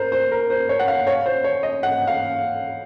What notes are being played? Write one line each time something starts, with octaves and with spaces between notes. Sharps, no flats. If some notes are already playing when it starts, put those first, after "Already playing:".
Already playing: A#4 C5
C5
A#4
C5
C#5
F#5
F5
C#5
C5
C#5
D#5
F#5
F5